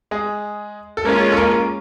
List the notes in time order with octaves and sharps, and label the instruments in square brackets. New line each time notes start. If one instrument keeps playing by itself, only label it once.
[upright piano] G#3 G#4
A4
[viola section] G#3 C#4 F4 [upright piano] A#3 A#4
[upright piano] A4
A#3 A#4